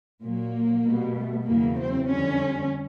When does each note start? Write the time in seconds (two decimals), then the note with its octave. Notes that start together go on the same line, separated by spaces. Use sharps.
0.22 A#2 F#3 A#3
0.84 B2 G3
1.15 A3
1.46 E2 C#3 F#3 A#3
1.78 C4
2.09 F2 D3 G3 C#4